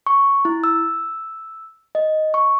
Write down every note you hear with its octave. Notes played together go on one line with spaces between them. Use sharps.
C#6
E4
E6
D#5
C#6